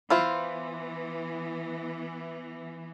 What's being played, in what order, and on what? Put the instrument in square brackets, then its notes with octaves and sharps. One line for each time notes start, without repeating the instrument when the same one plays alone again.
[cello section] E3 B3 [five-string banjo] E4 F4 C5